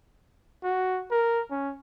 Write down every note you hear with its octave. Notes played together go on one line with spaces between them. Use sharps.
F#4
A#4
C#4